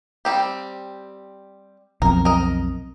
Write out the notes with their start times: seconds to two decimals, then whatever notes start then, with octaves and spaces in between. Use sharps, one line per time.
0.25 G3 C4 G4
2.02 B1 F2 A#4
2.25 A#4 D#5